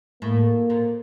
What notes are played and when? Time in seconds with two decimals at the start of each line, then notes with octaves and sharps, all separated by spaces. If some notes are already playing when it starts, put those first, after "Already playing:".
0.22 A2 A#3
0.70 A#2